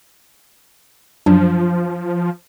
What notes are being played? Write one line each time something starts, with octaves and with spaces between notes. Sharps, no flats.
F#2 F3 F#3 D4